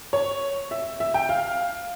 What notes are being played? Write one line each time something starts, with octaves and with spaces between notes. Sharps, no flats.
C#5
E5
E5
G5
F5